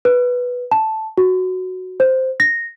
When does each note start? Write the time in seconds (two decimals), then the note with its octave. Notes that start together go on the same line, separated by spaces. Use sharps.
0.05 B4
0.71 A5
1.18 F#4
2.00 C5
2.40 A#6